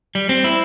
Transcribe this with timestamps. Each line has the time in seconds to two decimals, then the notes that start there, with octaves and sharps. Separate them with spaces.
0.15 G3
0.29 C4
0.44 E4